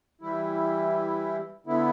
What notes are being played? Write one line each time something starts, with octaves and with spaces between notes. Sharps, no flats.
E3 G3 E4
D3 B3 E4